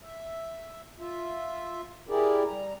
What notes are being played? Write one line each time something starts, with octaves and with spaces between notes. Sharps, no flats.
E5
F4 E5
E4 G4 G#4 A#4 D5
G3 A#5